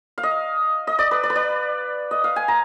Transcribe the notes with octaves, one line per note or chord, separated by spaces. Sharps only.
F5
D#5
D#5
D5
B4
D5
B4
D5
D#5
F5
G#5
A#5